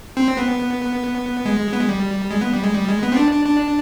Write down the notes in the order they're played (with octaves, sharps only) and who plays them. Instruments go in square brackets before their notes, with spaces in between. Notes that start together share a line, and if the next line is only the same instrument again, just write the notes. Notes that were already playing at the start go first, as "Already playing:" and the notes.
[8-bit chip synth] C4
B3
G#3
B3
G#3
G3
G#3
B3
G3
G#3
G3
G#3
B3
C4
D4
D4
D4